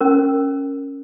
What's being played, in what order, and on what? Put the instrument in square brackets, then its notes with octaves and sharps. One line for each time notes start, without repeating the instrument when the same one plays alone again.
[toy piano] C#4 A#4